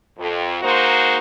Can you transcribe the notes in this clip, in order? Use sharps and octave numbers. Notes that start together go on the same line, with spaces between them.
F2
G#3 A#3 D#4 F#4 C5